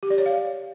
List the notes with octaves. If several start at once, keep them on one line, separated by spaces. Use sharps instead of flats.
G4
D5
C#5
F5